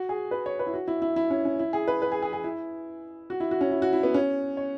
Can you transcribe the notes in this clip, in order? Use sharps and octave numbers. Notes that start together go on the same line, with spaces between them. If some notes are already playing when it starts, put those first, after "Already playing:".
Already playing: F#4
G#4
B4
C#5
B4
E4
F#4
E4
E4
E4
C#4
C#4
E4
G#4
B4
B4
G#4
G#4
G#4
E4
F#4
E4
F#4
C#4
E4
F#4
E4
B3
C#4
C#5